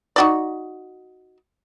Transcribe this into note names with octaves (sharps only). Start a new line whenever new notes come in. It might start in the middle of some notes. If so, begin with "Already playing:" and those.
D#4 F#4 D5